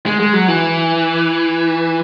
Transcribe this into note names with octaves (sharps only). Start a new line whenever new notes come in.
G#3
G#3
F#3
E3